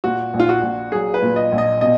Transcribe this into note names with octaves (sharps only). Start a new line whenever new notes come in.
A#2 F#4
A#1
F4
F#4
A#1
F#3 G#4
B4
A#2
D#5
A#1
D#5
B2 D#5